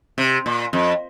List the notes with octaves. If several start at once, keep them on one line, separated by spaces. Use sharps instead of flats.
C3
A#2
F2